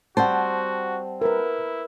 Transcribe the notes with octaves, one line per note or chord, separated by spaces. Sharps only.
G3 C4 F#4 C5 F#5 A5
E4 A#4 B4